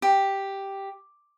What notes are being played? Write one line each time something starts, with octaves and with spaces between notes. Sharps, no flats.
G4